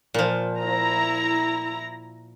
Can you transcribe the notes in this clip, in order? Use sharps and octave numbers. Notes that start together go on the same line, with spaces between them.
A#2 F3
E4 A#5